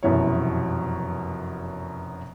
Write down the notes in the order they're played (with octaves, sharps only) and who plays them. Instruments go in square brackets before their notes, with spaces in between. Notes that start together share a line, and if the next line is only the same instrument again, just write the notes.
[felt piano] F1 F#2 B2 E3 E4 C#5